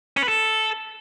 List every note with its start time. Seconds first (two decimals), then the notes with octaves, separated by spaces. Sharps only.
0.17 C#4
0.23 B4
0.28 A4